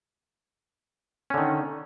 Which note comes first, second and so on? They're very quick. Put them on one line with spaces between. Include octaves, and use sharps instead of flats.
C#4 D3 D#3